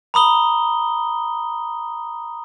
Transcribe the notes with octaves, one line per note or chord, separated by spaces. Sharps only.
A#5 B5 D#6 G7